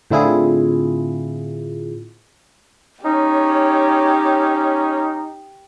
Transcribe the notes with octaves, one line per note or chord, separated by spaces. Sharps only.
A2 D3 C4 E4 F4 G#4
C#4 D#4 G4 C#5